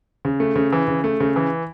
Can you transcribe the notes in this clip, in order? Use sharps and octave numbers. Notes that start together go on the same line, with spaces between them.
C#3
A3
C#3
E3
C#3
A3
C#3
E3